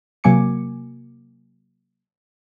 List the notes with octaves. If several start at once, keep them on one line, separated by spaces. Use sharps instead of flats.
C3 F#3 A#3 G#5 D6 C#7